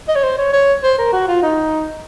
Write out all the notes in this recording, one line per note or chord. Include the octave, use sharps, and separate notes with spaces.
D#5
C#5
C5
C#5
C#5
C5
A#4
F#4
F4
D#4